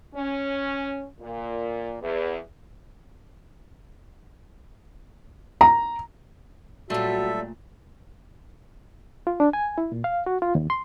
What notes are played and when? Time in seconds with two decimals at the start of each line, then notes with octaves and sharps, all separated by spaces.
0.13 C#4
1.20 A#2
2.01 E2
5.61 A#5
6.90 A#2 F#3 G3 A3 F4 F#4 A4 E5
9.27 F4
9.40 D4
9.53 G#5
9.78 E4
9.92 A#2
10.04 F5
10.26 F#4
10.42 F4
10.55 D#2
10.70 C6